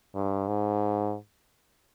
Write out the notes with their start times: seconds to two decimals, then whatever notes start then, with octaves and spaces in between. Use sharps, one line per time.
0.15 G2
0.48 G#2